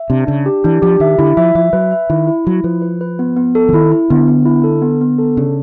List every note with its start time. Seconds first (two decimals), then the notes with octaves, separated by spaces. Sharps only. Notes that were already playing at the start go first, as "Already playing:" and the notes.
Already playing: E5
0.10 C3 D4
0.27 C#3 D4
0.46 G4
0.64 E3 D4
0.82 F3 G4
1.00 D#3 E5
1.18 D3 E4
1.37 F3 E5
1.55 F3 E5
1.73 F#3 B4
1.91 E5
2.10 D#3 E4
2.27 E4
2.45 F#3 E4
2.64 F3 B4
2.82 B4
3.01 B4
3.19 B3
3.37 B3
3.55 A4
3.69 E3
3.73 D#3 E4
3.92 E4
4.10 D3 B3
4.28 B3
4.46 E4
4.64 A4
4.82 B3
5.01 B3
5.18 A4
5.37 C#3 D4